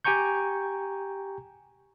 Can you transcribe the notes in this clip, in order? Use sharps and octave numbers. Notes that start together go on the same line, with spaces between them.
G4 G5 G#5 A#5 C#6 G6